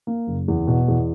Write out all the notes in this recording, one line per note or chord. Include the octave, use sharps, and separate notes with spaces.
A#3
F#1
E2
B2
E2